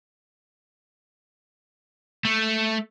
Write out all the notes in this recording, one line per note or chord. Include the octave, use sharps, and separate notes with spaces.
A3